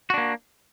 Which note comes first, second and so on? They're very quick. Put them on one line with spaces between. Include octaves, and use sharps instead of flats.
F#4 D4 A#3